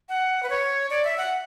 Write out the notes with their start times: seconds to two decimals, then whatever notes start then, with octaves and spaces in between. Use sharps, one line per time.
0.09 F#5
0.43 B4
0.50 C#5
0.90 D5
1.04 E5
1.18 F#5